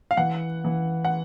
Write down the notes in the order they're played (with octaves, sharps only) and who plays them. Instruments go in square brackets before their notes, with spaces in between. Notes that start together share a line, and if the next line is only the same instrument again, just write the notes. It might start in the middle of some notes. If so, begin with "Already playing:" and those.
[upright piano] F5
[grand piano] E3 [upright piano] F#5
[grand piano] E3
[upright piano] F#5